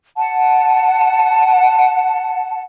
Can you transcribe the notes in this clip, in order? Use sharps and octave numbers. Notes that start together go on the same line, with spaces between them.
F#5 A5